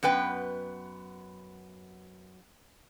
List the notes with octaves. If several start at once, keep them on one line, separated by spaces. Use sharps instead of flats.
F#2 B3 B4 G5